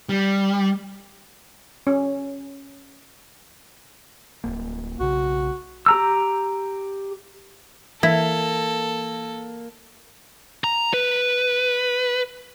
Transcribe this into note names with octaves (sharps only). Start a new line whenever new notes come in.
G3
C#4
D1 C2 A#3
B1 C#3 F#4
G4 A#5 E6
E3 A#3 E4 A4
A#5
B4